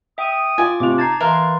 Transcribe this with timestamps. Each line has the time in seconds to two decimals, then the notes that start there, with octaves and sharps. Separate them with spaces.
0.18 E5 G5 D#6
0.58 F4 D5 G#5
0.80 C3 A3 D4 F4 D6 F7
0.98 D#4 A5 G#6 A6 C7
1.21 E3 A#4 B4 E5 F5 A#5 C6